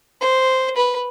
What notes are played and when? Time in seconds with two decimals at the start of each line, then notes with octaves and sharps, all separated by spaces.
0.21 C5
0.77 B4